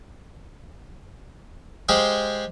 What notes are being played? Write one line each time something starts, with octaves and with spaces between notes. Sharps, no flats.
G#3 G4 G#4 C5 F5